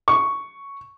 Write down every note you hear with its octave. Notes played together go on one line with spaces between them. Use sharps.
C#6